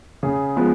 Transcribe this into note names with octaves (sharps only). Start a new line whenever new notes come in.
C#3 G#4
F3 G#3 B3